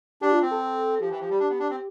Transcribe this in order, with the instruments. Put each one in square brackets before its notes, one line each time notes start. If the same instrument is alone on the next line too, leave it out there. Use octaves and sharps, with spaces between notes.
[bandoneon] D4 [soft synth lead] G4
[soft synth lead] F4
[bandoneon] C4
[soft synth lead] A4
[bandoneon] F3 [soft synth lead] G4
[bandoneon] E3
F3
G3
D4
B3
D4
C4